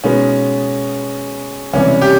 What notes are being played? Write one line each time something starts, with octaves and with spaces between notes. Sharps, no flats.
B2 G#3 B3 C#4 D#4
C#2 C3 E3 G3 C#4
G4